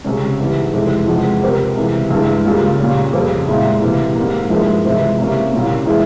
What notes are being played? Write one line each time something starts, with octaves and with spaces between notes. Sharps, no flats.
C#2 C3 G3 C#4
G#2 E3 G3
F2 C3 E3 G#3
E2 C3 F3 G#3
C3 G3 C4 G4 A#4
C#2 C3 E3
G2 E3 G#3
C#2 C#3 G3 A#3 F4
A#2 G3 C#4
F2 C#3 G3 C4
A#2 G#3 E4
C3 E3 G3
G#2 G3 A#3
G2 F3 G#3 E4 A#4
C3 E3 G#3 C4 E4
C3 G3 A#3 C#4 E4
C2 A#2 G3 A#3 C#4
C#3 E3 G#3 E4